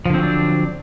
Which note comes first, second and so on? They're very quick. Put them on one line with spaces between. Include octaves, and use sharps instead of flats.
F3 D3 C4 F#3 D4